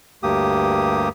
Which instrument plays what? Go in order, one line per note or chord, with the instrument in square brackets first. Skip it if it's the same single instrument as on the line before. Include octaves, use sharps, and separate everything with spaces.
[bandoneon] D2 G2 A#3 G4 D#6